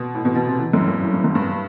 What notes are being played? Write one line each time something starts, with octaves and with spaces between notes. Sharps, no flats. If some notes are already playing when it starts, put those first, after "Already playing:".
Already playing: B2
A2
B2
B2
C3
E3
F#2
A2
G2
A2
G2
F#2
G2